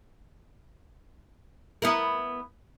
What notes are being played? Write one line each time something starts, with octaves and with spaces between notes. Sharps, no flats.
B3 E4 A#4